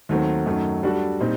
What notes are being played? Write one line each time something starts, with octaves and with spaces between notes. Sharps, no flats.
D#2 D#3 F#3 A3 C4
F#2 D#3 F#3 A3
G3 D4 F#4 A4
A#2 G3 C4 D#4